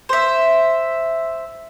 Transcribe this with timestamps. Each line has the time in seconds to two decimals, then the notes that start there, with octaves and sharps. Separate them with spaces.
0.09 C5 E5